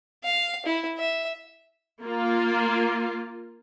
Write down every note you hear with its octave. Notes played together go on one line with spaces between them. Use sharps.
F5
E4
E5
A#3 F4